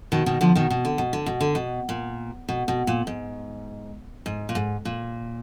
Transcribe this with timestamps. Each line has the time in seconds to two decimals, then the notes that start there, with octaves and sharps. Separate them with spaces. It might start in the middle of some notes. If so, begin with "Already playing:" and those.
0.12 B2 D#3
0.26 B2 D#3
0.41 D3 F3
0.55 B2 D#3
0.70 B2
0.85 D3
0.98 B2
1.13 D3
1.26 B2
1.41 D3
1.55 B2
1.89 A#2
2.49 B2
2.68 B2
2.87 A#2
3.07 G#2
4.26 G#2
4.49 A#2
4.55 G#2
4.85 A#2